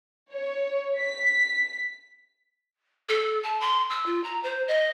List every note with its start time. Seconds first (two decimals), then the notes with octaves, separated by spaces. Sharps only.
0.30 C#5
0.99 B6
3.09 A4
3.43 A5
3.61 C6
3.90 E6
4.06 F4
4.24 A#5
4.43 C5
4.68 D#5